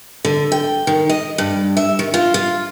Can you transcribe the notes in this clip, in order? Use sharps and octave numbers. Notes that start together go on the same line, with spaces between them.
D3
G5
D#3
D#5
G2
E5
D#3
F4
F4